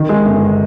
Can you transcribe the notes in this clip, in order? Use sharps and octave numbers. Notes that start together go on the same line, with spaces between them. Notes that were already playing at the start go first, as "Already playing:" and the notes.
Already playing: D#3
G#3
G1